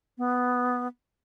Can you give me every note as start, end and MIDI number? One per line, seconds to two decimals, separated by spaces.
0.18 0.88 59